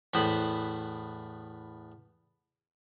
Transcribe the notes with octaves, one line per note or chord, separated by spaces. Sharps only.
E2 A2 B3 C5 B5